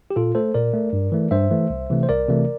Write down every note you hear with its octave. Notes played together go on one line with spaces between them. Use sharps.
G4
A#2 F4 A4
A3 A4 C5
A#2 A#4 D5
A3
G2
E3 A3
G2 C5 E5
E3 A3
C2
C3 E3 A3
C5
C2 A#4 D5
C3 E3 A3